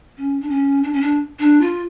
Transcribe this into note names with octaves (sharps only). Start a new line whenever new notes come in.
C#4
D4
C#4
D4
C#4
D4
D4
F4